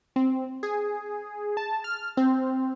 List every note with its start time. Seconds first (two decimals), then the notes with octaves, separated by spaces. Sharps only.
0.16 C4
0.63 G#4
1.57 A5
1.84 F6
2.17 C4